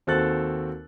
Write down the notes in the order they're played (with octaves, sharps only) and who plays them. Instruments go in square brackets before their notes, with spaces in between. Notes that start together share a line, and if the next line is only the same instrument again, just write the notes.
[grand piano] D#2 C4 F#4 A4 F#6 A6